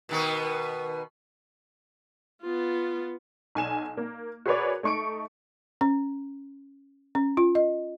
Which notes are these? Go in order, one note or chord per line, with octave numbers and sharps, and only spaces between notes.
B2 D#3 B3
B3 F4
B1 G#5 E7
A#3
F#4 G#4 A#4 B4 C#5 D5
A3 D#4 C#6 C#7 D7
C#4
C#4
F4
D#5